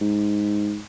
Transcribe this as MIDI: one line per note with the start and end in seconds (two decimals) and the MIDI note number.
0.01 0.80 44